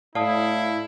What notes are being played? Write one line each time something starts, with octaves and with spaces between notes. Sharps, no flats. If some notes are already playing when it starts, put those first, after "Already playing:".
A2 E4 D5 F5 A5 D#6